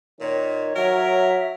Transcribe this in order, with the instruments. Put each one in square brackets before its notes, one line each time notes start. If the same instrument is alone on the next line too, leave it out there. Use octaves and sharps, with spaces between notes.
[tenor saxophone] A#2 [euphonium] D#3 [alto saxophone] C#5
[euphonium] F#3 [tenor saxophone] A#4 [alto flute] E5